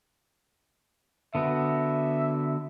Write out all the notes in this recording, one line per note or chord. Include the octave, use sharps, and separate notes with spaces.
D3 B3 F#4 E5